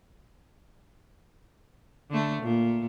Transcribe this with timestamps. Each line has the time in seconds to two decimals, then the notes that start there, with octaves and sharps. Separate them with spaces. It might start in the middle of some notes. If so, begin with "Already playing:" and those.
2.10 D3 A3
2.43 A#2